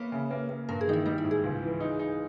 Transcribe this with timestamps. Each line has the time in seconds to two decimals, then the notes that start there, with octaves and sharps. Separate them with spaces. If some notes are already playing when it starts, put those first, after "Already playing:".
Already playing: A#3 B3 B4 C#5 E5
0.12 C#3
0.31 A#3
0.49 A#3
0.69 G2 A#4
0.81 G#4
0.87 D#3 D#4
0.93 E4
1.06 G3 D#4
1.18 E4
1.24 G#2
1.31 G#4
1.43 C#2
1.63 E3
1.80 D#4
1.99 D#4